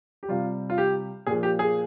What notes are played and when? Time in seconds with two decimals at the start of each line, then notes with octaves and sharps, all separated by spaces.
0.23 G4
0.29 C3 G3 F4
0.70 F4
0.78 G4
1.26 A#2 F3 G#4
1.43 G4
1.59 G#4